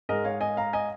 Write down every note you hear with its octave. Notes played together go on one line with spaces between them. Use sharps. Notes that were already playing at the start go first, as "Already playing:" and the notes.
G#2 G#3 A#4 D#5
C#5 F5
D#5 G#5
F5 A#5
D#5 G#5